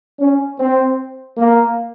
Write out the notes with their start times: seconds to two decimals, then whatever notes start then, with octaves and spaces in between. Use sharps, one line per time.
0.20 C#4
0.59 C4
1.38 A#3